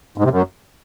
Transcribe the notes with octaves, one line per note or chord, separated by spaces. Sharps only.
G#2
C3
F#2